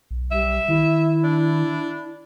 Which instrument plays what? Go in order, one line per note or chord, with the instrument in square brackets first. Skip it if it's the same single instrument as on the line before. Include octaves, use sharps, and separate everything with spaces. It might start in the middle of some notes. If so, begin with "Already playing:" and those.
[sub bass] B1
[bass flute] G3 [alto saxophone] E5
[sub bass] D#3 [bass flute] E4
[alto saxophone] D4